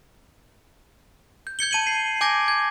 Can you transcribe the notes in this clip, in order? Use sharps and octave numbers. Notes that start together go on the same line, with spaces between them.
G6
G6 G#6 C#7 G7
A5 D#7 F#7
C7
G#5 D6 G6 G#6 A#6
G#6